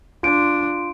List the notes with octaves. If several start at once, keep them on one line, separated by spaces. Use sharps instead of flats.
D4 F4 D7